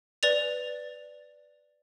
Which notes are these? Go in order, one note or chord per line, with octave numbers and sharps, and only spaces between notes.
B4 D5 A6 F7